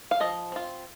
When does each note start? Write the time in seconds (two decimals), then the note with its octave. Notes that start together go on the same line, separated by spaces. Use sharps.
0.11 F5
0.20 F3 D#5
0.52 C4 F4